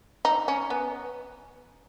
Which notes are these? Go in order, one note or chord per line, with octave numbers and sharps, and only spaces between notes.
D#4
C#4
B3